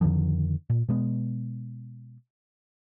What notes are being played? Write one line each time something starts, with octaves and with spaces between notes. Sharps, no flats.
F2 D3 D#3 F3
A#2
B2 G#3 B3